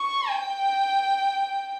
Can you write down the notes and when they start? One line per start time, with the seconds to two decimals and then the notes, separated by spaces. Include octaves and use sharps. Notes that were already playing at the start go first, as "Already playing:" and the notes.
Already playing: C#6
0.28 G5